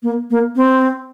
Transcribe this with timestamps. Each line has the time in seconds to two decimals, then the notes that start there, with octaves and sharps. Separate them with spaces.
0.03 A#3
0.30 A#3
0.56 C4